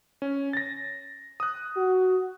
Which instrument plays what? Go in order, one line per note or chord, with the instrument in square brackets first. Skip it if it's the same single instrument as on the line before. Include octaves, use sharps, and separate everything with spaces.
[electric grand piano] C#4
A6 A#6
D#6 F#6
[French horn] F#4